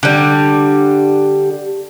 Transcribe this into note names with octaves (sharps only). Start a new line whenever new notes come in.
D3 G3